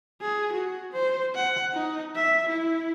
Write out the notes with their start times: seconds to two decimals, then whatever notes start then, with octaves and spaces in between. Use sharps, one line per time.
0.22 G#4
0.53 F#4
0.93 C5
1.36 F#5
1.74 D#4
2.16 E5
2.49 E4